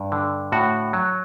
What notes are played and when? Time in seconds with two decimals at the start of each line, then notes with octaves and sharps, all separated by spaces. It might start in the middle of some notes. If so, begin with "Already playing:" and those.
Already playing: G2
0.12 D3
0.52 A2 F#4
0.93 F#3